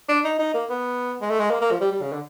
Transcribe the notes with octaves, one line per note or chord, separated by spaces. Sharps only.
D4
D#4
D#4
A#3
B3
G#3
A3
G#3
A#3
A#3
F3
G3
G3
C#3
D3